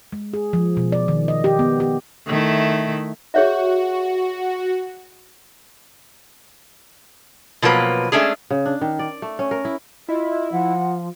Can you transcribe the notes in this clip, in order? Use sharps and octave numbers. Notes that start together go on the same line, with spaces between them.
G#3
G#4
F3
B2
D5
D#3
D#5
G4
B3
G4
D#3 A3 E4
F#4 G#4 C#5 E5
B2 F3 F#3 A#3 B4
G#3 A3 C#4 D4 G#4
C#3
D4
D#3
D5
A3
C#4
A#4
E4
E4 F4 D#5
F3 F#5